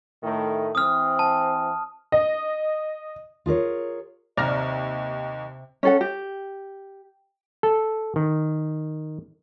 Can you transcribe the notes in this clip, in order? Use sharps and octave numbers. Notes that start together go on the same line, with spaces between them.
A2 D#3 A3
E3 C4 D#6 F6
A5
D#5
F4 G#4 A#4 C#5
D#2 C3 D5 D#5 A#5 F6
C#4 A4 F#5
G4
A4
D#3